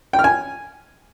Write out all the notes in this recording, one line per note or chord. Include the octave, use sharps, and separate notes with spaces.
G5
F6
G#5